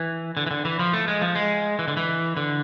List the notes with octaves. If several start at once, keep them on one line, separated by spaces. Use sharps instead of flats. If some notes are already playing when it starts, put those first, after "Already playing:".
Already playing: E3
D3
E3
D3
E3
F3
A3
G#3
F3
G#3
E3
D3
E3
D3